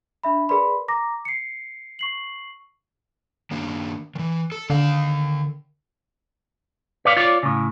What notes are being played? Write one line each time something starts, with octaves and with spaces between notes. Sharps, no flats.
D4 E5 B5
G#4 A#4 B4 D5 B5 C6
A#5 D6 A#6
C7 C#7
C#6 C7 F#7
D#3 A#3 D4
D#3 E3
A4
D3 D#3 F5
B4 C#5 D5 F5
F4 C#5 D5
A2 C#3